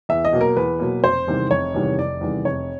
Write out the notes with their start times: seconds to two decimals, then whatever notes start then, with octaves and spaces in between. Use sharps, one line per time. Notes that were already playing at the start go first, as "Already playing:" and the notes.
0.09 E2 E5
0.25 D#5
0.33 B2 F#3 A#3
0.41 A#4
0.57 E2 B4
0.80 B2 F#3 A#3
1.03 F1 C5
1.28 E2 C3 D#3 G3
1.51 F1 C#5
1.74 E2 C3 D#3 G3
1.98 F1 D5
2.21 E2 C3 D#3 G3
2.45 F1 C#5